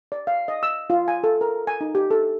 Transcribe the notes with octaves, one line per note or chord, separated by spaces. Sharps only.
D5
F5
D#5
E6
F4
G#5
A4
A#4
G#5
D#4
G4
A4